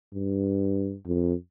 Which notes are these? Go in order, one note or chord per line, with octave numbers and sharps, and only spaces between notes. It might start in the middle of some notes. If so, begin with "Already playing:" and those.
G2
F2